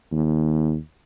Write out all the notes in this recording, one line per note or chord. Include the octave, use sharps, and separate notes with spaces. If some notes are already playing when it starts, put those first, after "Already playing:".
D#2